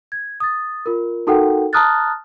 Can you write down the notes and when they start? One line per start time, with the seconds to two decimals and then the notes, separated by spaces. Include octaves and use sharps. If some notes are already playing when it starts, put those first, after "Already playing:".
0.12 G#6
0.40 D#6 A6
0.86 F4 A#4
1.27 D#4 F#4 A4 A#4 F#5 G5
1.73 A5 A#5 D#6 F6 F#6 A6